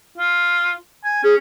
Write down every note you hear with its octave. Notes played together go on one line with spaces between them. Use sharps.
F4
G#5
C#4 G#4